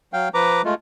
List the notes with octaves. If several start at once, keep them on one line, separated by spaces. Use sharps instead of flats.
F#3 F5 G5
F3 B4 A#5 D6
G#3 A3 F4